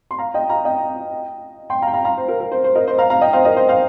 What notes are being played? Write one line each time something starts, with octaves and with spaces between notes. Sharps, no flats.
C6
F5 A#5
D#5 G5
F5 A#5
D#5 G5
G5 C6
F5 A#5
G5
F5 A#5
F5 A#5
C5
A#4
A#4
C5
C5
A#4 D#5
C5
F5 A#5
F5 A#5
D#5 G5
C5 F5
A#4 D#5
C5
C5 F5